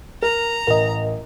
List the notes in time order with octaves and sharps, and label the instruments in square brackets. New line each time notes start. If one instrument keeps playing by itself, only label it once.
[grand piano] A#4 [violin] A#5
[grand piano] A1 [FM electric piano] A#4 D#5